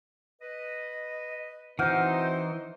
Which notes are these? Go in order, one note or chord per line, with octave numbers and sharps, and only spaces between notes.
B4 D#5
E3 C4 D#4 F#4 C5 F#5 F6 G6